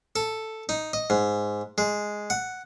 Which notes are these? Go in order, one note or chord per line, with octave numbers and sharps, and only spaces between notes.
A4
D#4
D#5
G#2
G#3
F#5